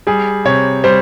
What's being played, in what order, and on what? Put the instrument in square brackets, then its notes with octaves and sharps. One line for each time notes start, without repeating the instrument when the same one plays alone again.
[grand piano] G3 G#4
C3 C#5
G3 C5